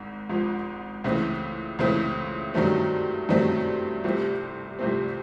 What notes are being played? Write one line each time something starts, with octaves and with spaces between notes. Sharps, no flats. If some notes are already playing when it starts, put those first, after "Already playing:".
Already playing: G#1 G#2
G#1 G#2 F3
C#2 C#3 E3 A3 C4
C#2 C#3 E3 A3 C4
G2 D#3 F#3 A3 C4
G2 D#3 F#3 A3 C4
C2 C3 F3 A3 C4
C2 C3 F3 A3 C4